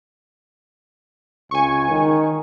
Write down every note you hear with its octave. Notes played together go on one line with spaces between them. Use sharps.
C#2 G#5 C#6
D#3